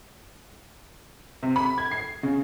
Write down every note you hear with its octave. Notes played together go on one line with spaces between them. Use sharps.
C3
B5
G#6
C7
C#3